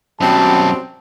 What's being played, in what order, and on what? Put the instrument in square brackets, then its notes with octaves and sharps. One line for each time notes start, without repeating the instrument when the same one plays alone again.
[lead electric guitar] F#2 B2 [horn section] F#3 G3 C4 [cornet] A5